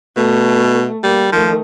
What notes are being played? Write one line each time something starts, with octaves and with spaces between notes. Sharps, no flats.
B2 A3
G3 A#3
D#3 F3 A3